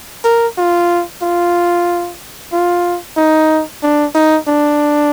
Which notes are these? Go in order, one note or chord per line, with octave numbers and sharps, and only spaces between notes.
A#4
F4
F4
F4
D#4
D4
D#4
D4